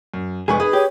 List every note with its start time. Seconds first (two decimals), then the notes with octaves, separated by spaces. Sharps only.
0.14 F#2
0.48 F1 G#3 G#4 B4 C#6
0.60 D#4 G#4 B4
0.73 G4 C#5